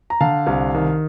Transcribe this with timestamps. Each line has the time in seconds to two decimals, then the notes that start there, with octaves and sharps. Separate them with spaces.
0.10 A#5
0.21 D3 F5 A5
0.47 C2
0.74 D#3